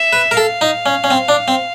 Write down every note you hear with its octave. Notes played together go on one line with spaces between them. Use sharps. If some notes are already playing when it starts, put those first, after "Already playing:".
Already playing: E5
B4
A#4
A4 F5
D#4
C#4
C#4
C4
D4
C4